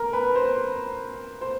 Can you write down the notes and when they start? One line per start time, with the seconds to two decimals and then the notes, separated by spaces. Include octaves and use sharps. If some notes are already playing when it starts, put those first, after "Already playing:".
Already playing: A#4
0.13 B4
0.35 C5
1.41 C5